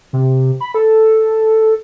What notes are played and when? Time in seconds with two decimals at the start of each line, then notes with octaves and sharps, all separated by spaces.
0.13 C3
0.61 B5
0.74 A4